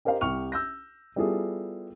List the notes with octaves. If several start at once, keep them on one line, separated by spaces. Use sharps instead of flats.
G4 A#4 C5 D#5 F5
C2 G4 C#6 F6 F7
E6 G6 A#6
G3 B3 E4 F4 G#4 A4